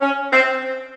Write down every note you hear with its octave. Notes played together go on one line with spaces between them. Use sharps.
C#4
C4